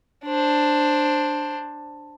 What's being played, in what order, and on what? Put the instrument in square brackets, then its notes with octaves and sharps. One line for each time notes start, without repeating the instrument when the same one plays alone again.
[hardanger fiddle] D4 C5